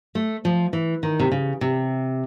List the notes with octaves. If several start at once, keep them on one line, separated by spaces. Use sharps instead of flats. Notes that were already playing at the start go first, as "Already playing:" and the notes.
A3
F3
E3
D#3
C3
C#3
C3